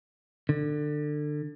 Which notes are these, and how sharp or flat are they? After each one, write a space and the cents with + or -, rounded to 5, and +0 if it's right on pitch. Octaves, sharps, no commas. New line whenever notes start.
D3 +25